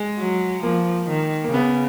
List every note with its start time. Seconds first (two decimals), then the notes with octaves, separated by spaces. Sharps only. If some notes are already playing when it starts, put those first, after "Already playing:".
Already playing: G#3
0.18 F#3
0.63 F3 A#3
1.09 D#3
1.44 A#3
1.53 C#3 B3